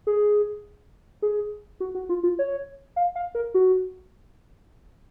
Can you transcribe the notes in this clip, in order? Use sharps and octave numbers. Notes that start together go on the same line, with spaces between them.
G#4
G#4
F#4
F#4
F4
F4
C#5
F5
F5
A#4
F#4